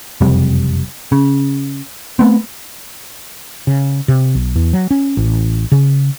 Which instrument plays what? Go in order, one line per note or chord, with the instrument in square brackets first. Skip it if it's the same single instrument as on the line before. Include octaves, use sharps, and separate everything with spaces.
[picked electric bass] F#1 F2 C3 G3
C#3
A3 B3 C4
[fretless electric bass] C#3
C3
B1
E2
F#3
C#4
A1
C#3